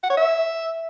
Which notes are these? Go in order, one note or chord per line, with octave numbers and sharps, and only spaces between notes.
F#5
C#5
E5